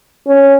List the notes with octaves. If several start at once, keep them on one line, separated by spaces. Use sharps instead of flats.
C#4